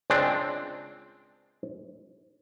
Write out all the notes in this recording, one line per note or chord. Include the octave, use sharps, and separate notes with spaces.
C#2 G#3 C4 D4 D5